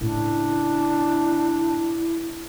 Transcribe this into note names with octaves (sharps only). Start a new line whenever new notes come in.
A2 C#3 D4 E4